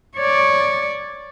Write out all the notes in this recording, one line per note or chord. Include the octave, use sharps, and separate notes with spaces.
C#5 D5